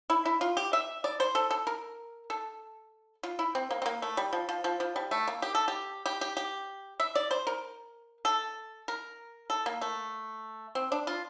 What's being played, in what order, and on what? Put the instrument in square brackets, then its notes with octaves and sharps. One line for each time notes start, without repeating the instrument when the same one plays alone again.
[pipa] E4
E4
F4
G4
E5
D5
C5
A4
A4
A#4
A4
F4
E4
C4
A#3
C4
A#3
A3
G3
F3
F3
F3
F3
G3
A3
A#3
G4
A4
G4
G4
G4
G4
E5
D5
C5
A#4
A4
A#4
A4
A#3
A3
C4
D4
F4